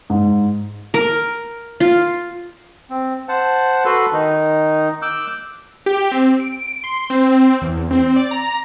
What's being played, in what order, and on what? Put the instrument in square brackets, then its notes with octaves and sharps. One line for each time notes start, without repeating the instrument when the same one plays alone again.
[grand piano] G#2
[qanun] A#4
F4
[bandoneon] C4
C5 F#5 A5
F#4 A4 B4 C6 F#6
D#3 D#4
D6 E6 F#6 G6
[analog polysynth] G4
C4
D7
C6
C4
E2
C4
D5
A#5